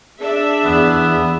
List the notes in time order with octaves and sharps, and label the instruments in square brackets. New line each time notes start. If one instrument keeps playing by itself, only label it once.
[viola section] D4 E5 [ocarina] G#4
[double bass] E2 [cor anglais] B3